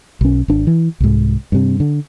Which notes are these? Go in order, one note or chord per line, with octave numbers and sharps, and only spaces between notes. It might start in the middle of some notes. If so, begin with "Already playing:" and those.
B1 C#4
G#1 D4
E3
C2 G#2
G2 C3
D3